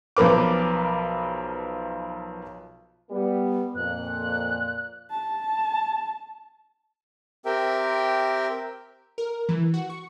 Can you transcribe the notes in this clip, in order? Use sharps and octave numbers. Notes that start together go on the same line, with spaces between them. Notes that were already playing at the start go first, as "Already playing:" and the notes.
B1 F3 A#4 B4 D6
G3 B3
F2 A#2 F#6
A5
C4 G4 A#4 E5 G5
A#4
E3
F#4
C#6